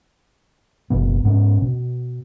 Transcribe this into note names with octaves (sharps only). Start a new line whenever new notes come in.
F#1 B2 B3
G#2 B3 C#4
B2